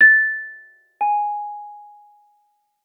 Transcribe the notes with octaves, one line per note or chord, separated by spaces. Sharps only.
A6
G#5